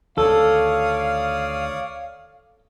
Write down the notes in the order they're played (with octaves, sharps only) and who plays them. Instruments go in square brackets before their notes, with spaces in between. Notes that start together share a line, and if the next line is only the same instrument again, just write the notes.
[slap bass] D2 D#3 [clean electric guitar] A4 [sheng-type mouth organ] C#5 D5 D#6 [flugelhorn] F5